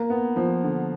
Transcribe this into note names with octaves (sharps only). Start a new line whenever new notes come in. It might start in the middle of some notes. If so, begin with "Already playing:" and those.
Already playing: A#3
B3
F3
D3